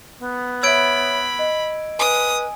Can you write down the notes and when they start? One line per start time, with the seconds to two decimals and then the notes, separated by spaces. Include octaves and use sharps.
0.19 B3
0.63 C#5 E5 B5 E6 G#6 D7
1.39 D#5
1.99 B4 G#5 D#6